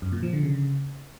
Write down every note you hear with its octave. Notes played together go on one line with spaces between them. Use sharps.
F#2
A#2
F3
D3
C#3